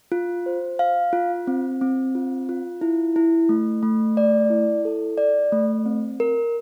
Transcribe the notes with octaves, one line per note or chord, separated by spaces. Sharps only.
F4
C5
F5
F4
C4
C4
F4
F4
E4
E4
A3
A3
D5
E4
A4
D5
A3
C4
A#4